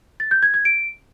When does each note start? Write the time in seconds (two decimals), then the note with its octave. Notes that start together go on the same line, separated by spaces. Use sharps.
0.20 A6
0.31 G6
0.43 G#6
0.54 G#6
0.65 D7